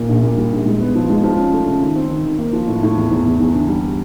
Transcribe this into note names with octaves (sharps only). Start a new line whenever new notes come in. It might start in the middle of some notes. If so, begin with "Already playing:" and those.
Already playing: A#2
A#1
A#2
G3
A#1
G#3
B3
F3
G#3
F3
C#4
A3
C#3
D#3
C4
D#3
D#3
A#3
F3
A2
A2
E2
E2
E2
E2
D3
G3